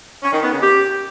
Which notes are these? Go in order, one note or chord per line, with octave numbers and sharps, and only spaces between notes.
C#4
D#3
B3
C#3
G4